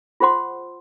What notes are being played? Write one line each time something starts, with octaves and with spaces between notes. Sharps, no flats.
F4 G#4 C5 F#5 C6